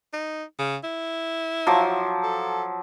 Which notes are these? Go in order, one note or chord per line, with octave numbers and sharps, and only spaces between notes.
D#4
C#3
E4
F3 F#3 D6
A4